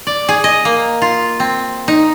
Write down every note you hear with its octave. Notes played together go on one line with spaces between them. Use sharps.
D5
G#4
D#5
A#3
F4
C4
D#4